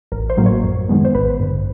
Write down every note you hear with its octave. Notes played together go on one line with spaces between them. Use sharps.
A1 A#4
C5
A2 F#3 A#3
C#5
F#2
D#3 G#3 B3
C5
A1 B4
G2 D3